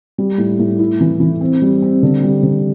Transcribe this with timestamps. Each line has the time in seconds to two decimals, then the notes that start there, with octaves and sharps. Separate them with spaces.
0.18 G3
0.38 A2
0.59 A2
0.79 E4
1.01 E3
1.20 E3
1.41 C4
1.62 G3
1.82 C4
2.03 D3
2.23 G3
2.43 D3